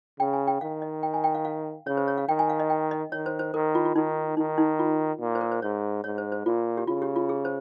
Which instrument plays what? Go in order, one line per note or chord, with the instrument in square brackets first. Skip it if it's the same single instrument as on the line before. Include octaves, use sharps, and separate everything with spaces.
[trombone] C#3 [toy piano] G5
[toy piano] G#5
G5
[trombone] D#3 [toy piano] F5
[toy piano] D#5
G5
G#5
G5
F5
F5
[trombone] C#3 [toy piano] C#5
[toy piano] C5
C#5
F5
[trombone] D#3 [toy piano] G5
[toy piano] G#5
F5
D#5
G5
D#5
[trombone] D#3 [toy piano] C#5
[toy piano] C5
C5
[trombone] D#3 [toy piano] A#4
[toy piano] F4
F4
[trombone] D#3 [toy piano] D#4
[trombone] D#3 [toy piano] D#4
[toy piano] D#4
F4
[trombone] A#2
[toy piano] C5
A#4
C5
[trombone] G#2 [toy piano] C#5
[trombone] G#2 [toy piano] C#5
[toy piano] C5
C5
[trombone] A#2 [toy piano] F4
[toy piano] G4
[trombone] C#3 [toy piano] F4
[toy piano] G4
F4
G#4
C5